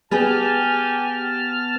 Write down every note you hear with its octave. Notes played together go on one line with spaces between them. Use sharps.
B3 G4 G#4 B4 G#5 A5 F6